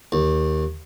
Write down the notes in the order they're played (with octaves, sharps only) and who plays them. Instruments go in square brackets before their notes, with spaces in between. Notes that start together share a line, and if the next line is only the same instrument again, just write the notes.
[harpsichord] D#2